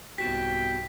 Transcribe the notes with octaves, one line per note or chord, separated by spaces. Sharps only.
C2 G#2 B3 F#4 G4 G5 B6